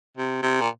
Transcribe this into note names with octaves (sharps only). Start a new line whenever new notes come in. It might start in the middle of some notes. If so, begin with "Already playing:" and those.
C3
C3
A#2